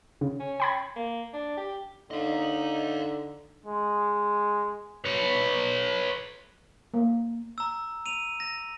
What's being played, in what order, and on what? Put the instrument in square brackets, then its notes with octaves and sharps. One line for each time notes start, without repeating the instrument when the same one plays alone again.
[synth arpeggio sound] C#3
[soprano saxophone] C#4
[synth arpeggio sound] G5 B5 G#6
[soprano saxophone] A#3
D4
G4
[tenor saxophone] D3 [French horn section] D#4 [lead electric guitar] D#5 F5
[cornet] G#3
[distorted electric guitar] B4 C#5
[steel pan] A#3
[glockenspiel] A#5 E6
D#7 F7
A#6